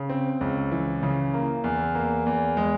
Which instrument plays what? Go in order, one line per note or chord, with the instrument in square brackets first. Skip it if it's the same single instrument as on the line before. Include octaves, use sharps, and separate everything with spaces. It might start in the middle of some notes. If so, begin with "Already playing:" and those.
Already playing: [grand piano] C#3
C4
C#2
E3
C#3
A#3
E2
A#3
E2
G#3